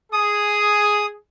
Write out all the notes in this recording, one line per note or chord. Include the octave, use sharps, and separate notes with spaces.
G#4 D#6